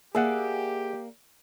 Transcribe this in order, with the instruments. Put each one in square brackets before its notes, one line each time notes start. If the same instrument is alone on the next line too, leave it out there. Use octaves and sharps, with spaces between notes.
[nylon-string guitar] A#3 D5 [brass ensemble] G4 [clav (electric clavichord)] G#4 E5 F#5